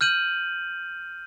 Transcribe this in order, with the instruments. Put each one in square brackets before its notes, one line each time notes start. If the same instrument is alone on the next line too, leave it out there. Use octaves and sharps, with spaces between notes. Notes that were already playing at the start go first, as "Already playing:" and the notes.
[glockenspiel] F6 G6 D#7 F#7